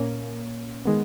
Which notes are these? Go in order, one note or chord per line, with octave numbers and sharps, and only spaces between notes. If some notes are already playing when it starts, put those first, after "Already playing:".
Already playing: A#2 A#3 C#4
D#3 G#3 B3